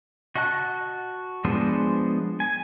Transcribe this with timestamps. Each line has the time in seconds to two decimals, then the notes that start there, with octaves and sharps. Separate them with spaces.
0.36 F#4 D#5 F#5 A5 F#6
1.45 F3 G#3 B3 D4 C5
2.40 G#5